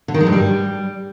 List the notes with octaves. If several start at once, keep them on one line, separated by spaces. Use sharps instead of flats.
D3
D#3
G#3
G2
G3